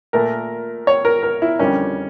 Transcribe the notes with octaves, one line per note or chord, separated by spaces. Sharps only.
A#2 A3 A#4
C#5
A#4
A#4
E4
F2 D3 G3 A#3 C#4